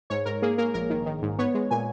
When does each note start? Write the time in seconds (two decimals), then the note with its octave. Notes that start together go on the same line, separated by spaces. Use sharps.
0.10 G#2 C#5
0.26 G#2 A#4
0.42 A#3 G#4
0.58 A#3 A#4
0.74 A#1 A#4
0.90 D#3
1.06 D#3
1.22 G#2
1.39 B3 C#5
1.54 G#3
1.71 A#2 G#5